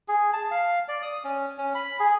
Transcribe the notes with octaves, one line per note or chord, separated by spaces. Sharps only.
G#4
A5
F5
D5
D#6
C#4
C#4
B5
G#4